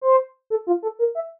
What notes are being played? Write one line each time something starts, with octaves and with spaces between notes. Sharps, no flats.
C5
A4
F4
A4
A#4
E5